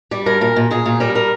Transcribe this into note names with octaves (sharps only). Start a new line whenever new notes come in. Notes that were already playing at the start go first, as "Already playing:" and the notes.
G3 D5
G2 A#4
A#2 A#4
A#2
A#2 G#4
A#2
G3 A#4
A#4